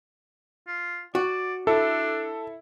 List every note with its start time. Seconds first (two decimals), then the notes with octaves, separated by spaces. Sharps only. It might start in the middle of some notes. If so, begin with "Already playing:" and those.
0.68 F4
1.15 F#4 D5
1.67 D4 E4 A4